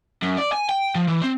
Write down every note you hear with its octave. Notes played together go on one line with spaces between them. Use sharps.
F#2
D5
G#5
G5
F3
E3
C4